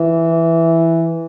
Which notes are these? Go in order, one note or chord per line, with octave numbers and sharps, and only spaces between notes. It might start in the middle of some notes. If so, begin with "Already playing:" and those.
Already playing: E3